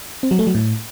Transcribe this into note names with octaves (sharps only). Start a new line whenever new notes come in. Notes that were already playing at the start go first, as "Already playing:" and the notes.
C4
F#3
A3
F#3
A2